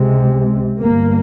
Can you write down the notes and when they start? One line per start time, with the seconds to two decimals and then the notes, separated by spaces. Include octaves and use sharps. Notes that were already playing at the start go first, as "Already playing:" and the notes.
Already playing: C#2 C3 G#3
0.80 G1 G2 A#3